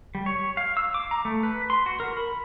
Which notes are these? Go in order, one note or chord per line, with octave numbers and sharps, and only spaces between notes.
G3
C#5
F5
E6
D6
A#5
A3
B4
C6
F#4
A#4
B5